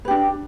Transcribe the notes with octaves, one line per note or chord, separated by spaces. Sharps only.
D4 G4 B4